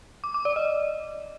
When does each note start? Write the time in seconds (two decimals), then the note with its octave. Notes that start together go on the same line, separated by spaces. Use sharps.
0.24 D6
0.34 D6
0.45 D5
0.56 D#5